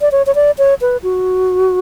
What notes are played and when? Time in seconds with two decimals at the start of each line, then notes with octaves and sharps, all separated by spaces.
0.01 D5
0.12 C#5
0.26 C#5
0.35 D5
0.58 C#5
0.81 B4
1.03 F#4